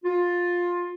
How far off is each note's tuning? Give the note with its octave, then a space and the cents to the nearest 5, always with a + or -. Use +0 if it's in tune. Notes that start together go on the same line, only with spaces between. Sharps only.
F4 +15